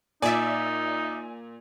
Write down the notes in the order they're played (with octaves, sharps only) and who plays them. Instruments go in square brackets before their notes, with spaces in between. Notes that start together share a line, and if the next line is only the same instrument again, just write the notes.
[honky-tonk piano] A#2 [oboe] D#4 [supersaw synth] D5 E5 [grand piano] G#5